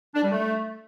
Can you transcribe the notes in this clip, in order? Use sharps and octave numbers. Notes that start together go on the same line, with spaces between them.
D4
G3
A3